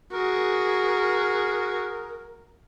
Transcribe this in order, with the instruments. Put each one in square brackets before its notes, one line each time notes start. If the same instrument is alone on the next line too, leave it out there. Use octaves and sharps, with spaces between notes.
[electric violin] F#4 G#4 [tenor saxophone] A#4